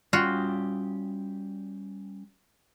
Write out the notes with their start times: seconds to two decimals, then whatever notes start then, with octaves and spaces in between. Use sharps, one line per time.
0.13 G3 C#4 F4 F#4 G5